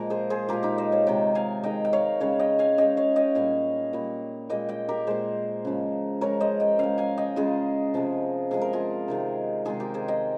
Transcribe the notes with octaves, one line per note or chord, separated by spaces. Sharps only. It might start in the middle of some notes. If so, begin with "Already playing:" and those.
Already playing: A#2 F3 G#3 A#4
G#4 C5
G#4 C5
A#2 F3 G#3 G4 A#4
D#4 G4
C5 D#5
C#5 F5
C3 D#3 G#3 D#5 G5
F5 G#5
C3 D#3 G#3 D#5 G5
G5
C#5 F5
C#3 G#3 C#5 F5
D#5 G5
F5 G#5
C#3 G#3 D#5 G5
C#5 F5
D#5 G5
A#2 G3 F5 G#5
A#2 G3
A#2 G#3 D#5 G5
D#5 G5
G4 A#4
A#2 G#3 G#4 C5
C#3 F3 G#3
C#3 F3 G#3 A#4 C#5
C5 D#5
D#5 G5
C#3 G#3 F5 G#5
F5 G#5
D#5 G5
C#3 G#3 F4 G#4
C3 F3 G#3
C3 F3 G#3 G#4
A#4
F4 G#4
C3 D#3 G#3
C3 D#3 G#3 F4 G#4
G4 A#4
G#4 C5
D#5 G5